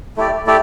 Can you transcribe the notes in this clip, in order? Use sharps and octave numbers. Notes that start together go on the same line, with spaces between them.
A3 E4 G4 D5
A3 E4 G4 D5